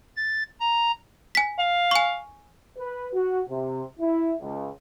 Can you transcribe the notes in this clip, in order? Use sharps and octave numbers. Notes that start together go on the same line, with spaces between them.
A6
A#5
G#5 B6
F5
G#5 C#6
B4
F#4
C3
E4
C#2